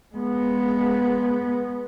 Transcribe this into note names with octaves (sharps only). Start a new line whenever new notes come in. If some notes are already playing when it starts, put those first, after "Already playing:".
G#3 B3